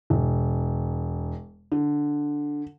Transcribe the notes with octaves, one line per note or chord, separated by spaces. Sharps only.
E1
D3